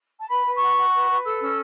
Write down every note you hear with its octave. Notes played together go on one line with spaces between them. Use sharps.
A5
B4 B5
B4
C#6
F#4
F#4
B4
B4
A4 E6
C#4 E6